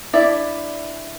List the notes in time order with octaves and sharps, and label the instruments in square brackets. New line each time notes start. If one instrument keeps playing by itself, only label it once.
[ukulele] D4 E4 D5 E5